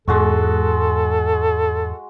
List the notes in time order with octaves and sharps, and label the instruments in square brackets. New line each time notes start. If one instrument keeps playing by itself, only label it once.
[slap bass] E2 G#2 [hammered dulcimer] G#3 F#4 C#6 [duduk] A4